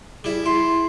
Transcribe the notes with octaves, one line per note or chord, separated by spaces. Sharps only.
G3 E4 G#4
E4 C6